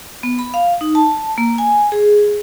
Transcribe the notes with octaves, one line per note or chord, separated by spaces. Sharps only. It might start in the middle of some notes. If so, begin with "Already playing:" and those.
B3
B5
F5
D#4
A5
A#3
G#5
G#4